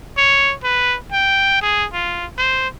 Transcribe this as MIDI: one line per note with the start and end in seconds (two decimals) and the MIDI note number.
0.17 0.54 73
0.64 0.97 71
1.12 1.59 79
1.62 1.86 68
1.93 2.26 65
2.38 2.68 72